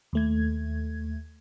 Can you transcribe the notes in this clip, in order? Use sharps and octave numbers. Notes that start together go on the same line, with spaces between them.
D#2 A3 G#6